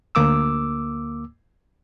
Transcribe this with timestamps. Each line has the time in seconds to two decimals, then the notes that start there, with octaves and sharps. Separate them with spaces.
0.15 D2 A#3 D6 E6